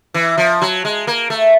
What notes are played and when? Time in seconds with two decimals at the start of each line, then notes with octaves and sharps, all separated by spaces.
0.14 E3
0.38 F3
0.62 F#3
0.85 G#3
1.07 A#3
1.30 A3